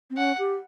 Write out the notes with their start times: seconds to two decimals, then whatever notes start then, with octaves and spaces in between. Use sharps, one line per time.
0.10 C4
0.17 C#4 F#5
0.38 G4